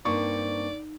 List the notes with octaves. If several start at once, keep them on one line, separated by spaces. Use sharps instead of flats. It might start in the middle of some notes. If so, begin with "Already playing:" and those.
G2 A#3 C4 D#4 D5 C#6